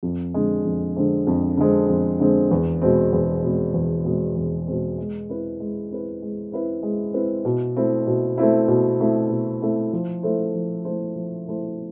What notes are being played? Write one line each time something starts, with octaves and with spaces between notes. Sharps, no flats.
F2
D3 G#3 C4
F2
D3 G#3 C4
F2
D3 G#3 C4
F2
D3 G#3 C4
E2
B2 G#3 C4
E2
B2 G#3 C4
E2
B2 G#3 C4
E2
B2 G#3 C4
G#3
C4 E4 B4
G#3
C4 E4 B4
G#3
C4 E4 B4
G#3
C4 E4 B4
B2
A3 C4 E4
B2
A3 C4 E4
B2
A3 C4 E4
B2
A3 C4 E4
F3
A3 E4 A4 C5
F3
A3 E4 A4 C5
F3
A3 E4 A4 C5